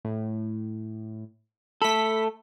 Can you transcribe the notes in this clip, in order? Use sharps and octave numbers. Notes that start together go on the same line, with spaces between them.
A2
A3 A4 B5 B6